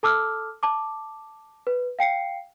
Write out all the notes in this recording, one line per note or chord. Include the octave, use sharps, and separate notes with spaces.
A4 A5 D6 E6 F6
A5 D6
B4
F5 G5 C7 C#7